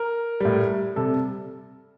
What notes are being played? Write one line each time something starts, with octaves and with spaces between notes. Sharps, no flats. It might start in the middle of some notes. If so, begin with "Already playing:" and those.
Already playing: A#4
A2 G3
C3 G3 A4